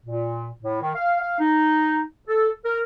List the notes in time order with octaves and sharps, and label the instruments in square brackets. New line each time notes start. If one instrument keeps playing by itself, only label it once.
[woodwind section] A#2
A2
D#3
F5
F5
D#4
A4
A#4